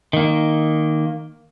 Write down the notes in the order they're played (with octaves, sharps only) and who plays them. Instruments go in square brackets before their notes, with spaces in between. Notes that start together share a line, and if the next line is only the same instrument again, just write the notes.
[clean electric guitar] D#3 A#3